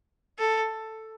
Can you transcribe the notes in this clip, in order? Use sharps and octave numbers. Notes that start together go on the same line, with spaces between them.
A4